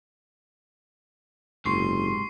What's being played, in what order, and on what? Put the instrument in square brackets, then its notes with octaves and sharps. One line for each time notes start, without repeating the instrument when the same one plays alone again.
[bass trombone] F#1 [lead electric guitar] G#2 C3 [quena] C6 [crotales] C#6 C7